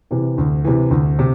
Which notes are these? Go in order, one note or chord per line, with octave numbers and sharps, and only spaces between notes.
C3 E3
D2
C3 E3
D2
C3